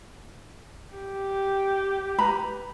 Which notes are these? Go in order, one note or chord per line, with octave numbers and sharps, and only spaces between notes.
G4
B4 A#5 B5